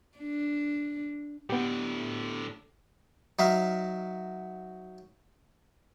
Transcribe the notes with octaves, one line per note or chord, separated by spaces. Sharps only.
D4
A2 D3 B3 G4
F#3 D#4 E5 F5